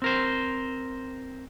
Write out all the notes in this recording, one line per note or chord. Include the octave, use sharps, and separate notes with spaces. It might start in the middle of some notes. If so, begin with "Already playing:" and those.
C4 A#4 C5